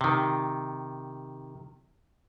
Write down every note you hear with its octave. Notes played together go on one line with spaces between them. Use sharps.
C3 D#3